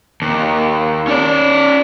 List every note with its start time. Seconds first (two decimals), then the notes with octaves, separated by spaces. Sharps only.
0.22 D#2
1.08 C#4 D5